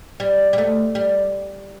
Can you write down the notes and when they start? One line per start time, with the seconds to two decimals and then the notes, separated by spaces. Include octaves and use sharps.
0.20 G3
0.53 G3
0.58 A3
0.95 G3